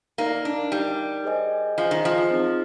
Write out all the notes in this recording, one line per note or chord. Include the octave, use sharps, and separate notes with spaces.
A#3 D#4 A#4 D5
D4
G3 D#4 A#4 D5
G#4 C5 D#5 G#5
F3 G#4 C5 D#5 G#5
D#3
F3
C4 D#4 G#4